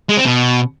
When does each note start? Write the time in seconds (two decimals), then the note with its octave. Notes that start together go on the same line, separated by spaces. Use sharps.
0.09 G#3
0.17 C4
0.26 B2